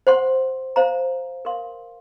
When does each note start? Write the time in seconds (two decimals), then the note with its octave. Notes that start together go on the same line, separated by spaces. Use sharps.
0.07 C5 F#5 C6
0.76 C5 F5 A#5
1.45 A#4 F5 C6